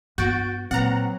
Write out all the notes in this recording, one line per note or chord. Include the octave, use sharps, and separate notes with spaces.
G2 B3 F#4 G6 A6 D7
A#2 F#3 C4 B4 F#5 A#5